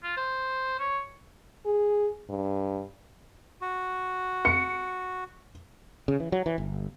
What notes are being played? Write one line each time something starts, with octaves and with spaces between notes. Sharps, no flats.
F4
C5
C#5
G#4
G2
F#4
C#7
C#3
E3
F#3
E3
G1